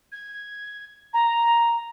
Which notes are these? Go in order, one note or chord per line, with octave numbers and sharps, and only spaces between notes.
G#6
A#5